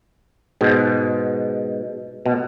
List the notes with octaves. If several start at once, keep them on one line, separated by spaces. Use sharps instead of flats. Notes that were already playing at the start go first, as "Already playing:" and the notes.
G#2 B2
B2